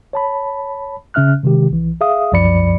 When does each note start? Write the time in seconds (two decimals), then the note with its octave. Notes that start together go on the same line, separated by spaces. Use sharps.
0.13 C#5 A5 B5
1.14 C#3 C#4 E5 F6 F#6
1.43 C3 D#3 G#3 G4
1.71 B1 E3
2.01 G#4 E5 F5 D#6
2.32 C2 F#2 F3 D5 B5 C#7